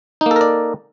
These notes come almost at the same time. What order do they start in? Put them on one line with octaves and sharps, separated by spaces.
D#4 A#3 A4 A#4 D5